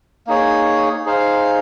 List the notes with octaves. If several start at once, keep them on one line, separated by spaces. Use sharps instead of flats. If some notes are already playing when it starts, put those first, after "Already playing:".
A#3 D#4 G#4 C#5
D#4 G#4 C5 F5